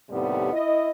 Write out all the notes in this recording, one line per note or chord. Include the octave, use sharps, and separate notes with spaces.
D#2 A2 C3 G3 B3
E4 D#5